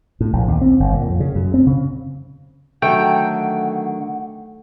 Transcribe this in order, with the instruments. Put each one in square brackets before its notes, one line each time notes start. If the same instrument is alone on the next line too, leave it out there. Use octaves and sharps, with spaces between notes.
[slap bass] A2
A#1
D#2
C4
G1
A#2
F2
C#3
F#2
C4
C#3
[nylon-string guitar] D3 D#3 F#3 [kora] A3 [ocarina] F#5 [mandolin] G5